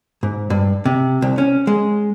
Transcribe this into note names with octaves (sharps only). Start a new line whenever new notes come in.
G#2
G2
C3
C2
C#4
G#3